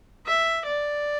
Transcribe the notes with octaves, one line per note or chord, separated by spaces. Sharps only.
E5
D5